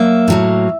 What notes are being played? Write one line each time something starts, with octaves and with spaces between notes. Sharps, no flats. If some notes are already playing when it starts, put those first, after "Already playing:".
Already playing: F#3 A#3 E5
A2 F#3 A#3